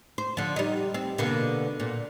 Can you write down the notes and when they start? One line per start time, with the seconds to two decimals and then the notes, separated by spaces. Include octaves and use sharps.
0.18 C5
0.37 D3 F3
0.56 G3 D#4
0.94 C4
1.18 B2 D3 A#3
1.80 A#2